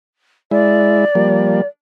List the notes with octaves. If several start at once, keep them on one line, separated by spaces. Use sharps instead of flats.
G#3 E4 D5
F3 G3 A#3